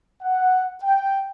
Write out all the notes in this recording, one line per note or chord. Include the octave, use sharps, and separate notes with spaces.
F#5
G5